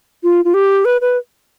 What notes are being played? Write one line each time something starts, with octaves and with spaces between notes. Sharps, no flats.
F4
F4
G4
B4
B4